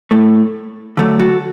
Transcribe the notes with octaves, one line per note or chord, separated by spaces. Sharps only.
A2 A3
D3 F#3 A3
F#4 A4